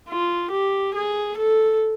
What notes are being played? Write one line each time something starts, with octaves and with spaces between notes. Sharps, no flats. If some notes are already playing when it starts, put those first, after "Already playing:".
F4
G4
G#4
A4